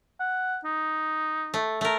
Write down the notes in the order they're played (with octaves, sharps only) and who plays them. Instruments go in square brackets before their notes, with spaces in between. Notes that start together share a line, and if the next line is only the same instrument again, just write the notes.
[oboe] F#5
D#4
[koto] A3
A3 A#4